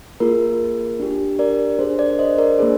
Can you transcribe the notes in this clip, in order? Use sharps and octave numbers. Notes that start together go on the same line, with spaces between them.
A#3 F4 G#4 A#4
D4 G4
A#4 D5
D4 G#4 C5
A#4 D5
C5 D#5
A#4 D5
A#3 D4 G#4 C5